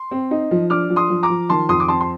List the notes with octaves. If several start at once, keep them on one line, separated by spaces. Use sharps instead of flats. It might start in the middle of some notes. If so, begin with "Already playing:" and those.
Already playing: C6
C4
D#4
F3
D4 D6 F6
F3
C6 D#6
F3
A#5 D6
F3
D#3 A5 C6
F2 C6 D#6
D6
C4 A5 C6
C6